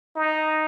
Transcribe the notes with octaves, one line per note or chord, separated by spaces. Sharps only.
D#4